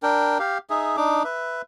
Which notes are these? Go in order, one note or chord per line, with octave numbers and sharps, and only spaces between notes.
D4 A#4 G5
G4 F5
D#4 G#4 E5
D4 D#4 D6
B4 E5